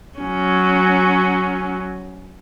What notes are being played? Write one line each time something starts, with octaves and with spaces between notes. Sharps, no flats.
F#3 C#4